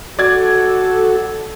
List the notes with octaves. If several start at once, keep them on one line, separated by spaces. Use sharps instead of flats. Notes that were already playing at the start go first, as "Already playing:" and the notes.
F#4 A4 D5 G#6